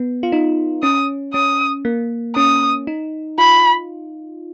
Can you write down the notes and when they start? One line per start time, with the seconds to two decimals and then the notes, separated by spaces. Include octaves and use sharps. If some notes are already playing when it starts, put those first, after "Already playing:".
Already playing: B3
0.23 F4
0.32 D#4
0.83 C#4 D#6
1.34 C#4 D#6
1.85 A#3
2.36 C#4 D#6
2.87 D#4
3.38 F4 B5